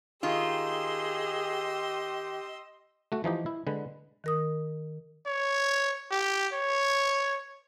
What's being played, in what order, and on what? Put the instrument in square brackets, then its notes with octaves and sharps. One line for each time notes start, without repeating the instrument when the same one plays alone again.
[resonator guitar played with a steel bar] D#3 F4 [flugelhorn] G4 [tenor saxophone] G#4 [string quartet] D#5 C6 E6
[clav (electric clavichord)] A3 F#4
E3 F3 D#4 G4
E4
D3 G#3 B4
[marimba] D#3 A#4 D#6
[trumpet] C#5
G4
C#5